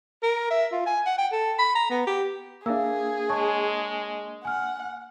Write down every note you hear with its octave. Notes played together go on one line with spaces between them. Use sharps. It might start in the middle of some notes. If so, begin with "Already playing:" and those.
A#4
E5
F4
G#5
F#5
G5
A4
B5
A#5
B3
G4
A#3 D4 G#4 E5 F5 E6
G#3 C#5 A5 C#6
F#5 G#5 F6